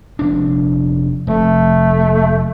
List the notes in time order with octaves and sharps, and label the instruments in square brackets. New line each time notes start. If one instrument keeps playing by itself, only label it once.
[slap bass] F1 D4
[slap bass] F1 [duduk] A3